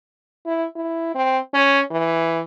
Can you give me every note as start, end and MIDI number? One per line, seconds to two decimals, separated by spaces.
0.46 0.66 64
0.75 1.12 64
1.15 1.38 60
1.54 1.81 61
1.91 2.42 52